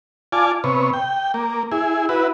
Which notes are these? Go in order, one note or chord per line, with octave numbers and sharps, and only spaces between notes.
F4 D5 G#5 A5
C3 B3 C#5
G5
A#3
E4 G#4
E4 F#4 B4